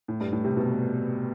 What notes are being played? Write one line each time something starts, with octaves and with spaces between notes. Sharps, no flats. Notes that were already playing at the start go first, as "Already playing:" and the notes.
A2
G2
A2
C3
B2